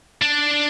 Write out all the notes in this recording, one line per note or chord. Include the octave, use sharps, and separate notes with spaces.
D4